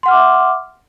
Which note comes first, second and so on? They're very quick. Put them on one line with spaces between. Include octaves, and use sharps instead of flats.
C6 F#5 F6 D6 E5